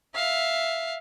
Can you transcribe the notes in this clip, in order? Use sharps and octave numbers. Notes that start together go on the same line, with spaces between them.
E5 F5